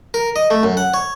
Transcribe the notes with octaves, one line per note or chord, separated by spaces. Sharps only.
A#4
D#5
A3
F#2
F#5
C#5